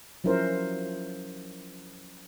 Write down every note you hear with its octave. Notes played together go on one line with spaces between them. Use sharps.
F3 F#3 C#4 E4 A#4 C5